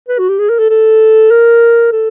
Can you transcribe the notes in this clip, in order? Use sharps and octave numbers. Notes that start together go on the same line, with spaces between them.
B4
F#4
G4
G#4
A#4
A4
A4
A#4
A4